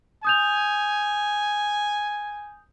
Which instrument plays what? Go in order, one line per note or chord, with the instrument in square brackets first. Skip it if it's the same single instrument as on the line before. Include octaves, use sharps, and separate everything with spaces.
[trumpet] G#5 [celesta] D#6 G6 F7